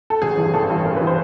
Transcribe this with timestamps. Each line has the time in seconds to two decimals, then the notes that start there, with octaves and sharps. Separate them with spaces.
0.10 A4
0.22 A1 G#4
0.37 G2 E3
0.54 A1 A4
0.70 G2 E3
0.85 A1 A#4
0.96 B4
1.01 E3
1.07 C5